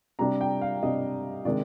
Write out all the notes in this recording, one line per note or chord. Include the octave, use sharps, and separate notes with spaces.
C3 G3 D4 A#5
G5
F5
C3 G3 D4 D#5
C3 D#3 G#3 D4 D5